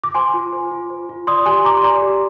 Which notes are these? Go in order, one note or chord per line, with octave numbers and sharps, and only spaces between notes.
D6
C5 G#5 C6
F4
C5
F4
C5
F4
D5 C6 D#6
G4 G#5 C6
G4 A#5 D6
C6
D5 A#5 D6
G4